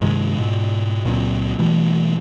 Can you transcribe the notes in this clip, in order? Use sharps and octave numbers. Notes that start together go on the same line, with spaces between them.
G2 C3 D#3 G#3
G#2 B2
C#2 A#2 F#3 C4
B2 E3 G3 A3